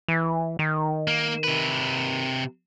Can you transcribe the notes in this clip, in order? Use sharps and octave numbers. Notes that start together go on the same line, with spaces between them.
E3
D#3
A#3
C3 B4